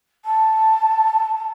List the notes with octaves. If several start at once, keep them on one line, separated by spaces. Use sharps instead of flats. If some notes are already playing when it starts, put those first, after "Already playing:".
A5